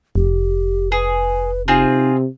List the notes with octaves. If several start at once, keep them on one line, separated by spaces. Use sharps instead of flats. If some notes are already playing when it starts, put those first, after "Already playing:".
F1 G4
G#4 B4
C3 C4 D#4 F4 G#4